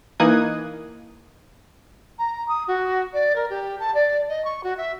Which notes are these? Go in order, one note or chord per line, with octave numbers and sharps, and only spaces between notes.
E3 A#3 D#4 D#6 F#6 G#6
A#5
D#6
F#4
D5
A#4
G4
A5
D5
D#5
C#6
F#4
E5